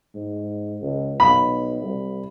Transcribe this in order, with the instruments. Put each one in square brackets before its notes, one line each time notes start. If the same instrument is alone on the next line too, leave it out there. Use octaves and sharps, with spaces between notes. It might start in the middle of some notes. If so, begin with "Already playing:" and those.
[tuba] G#2
C#2
[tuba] B1 [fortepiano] B5
[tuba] C2